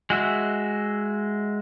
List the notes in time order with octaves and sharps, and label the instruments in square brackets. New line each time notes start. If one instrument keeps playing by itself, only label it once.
[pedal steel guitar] G#3 F#4 E5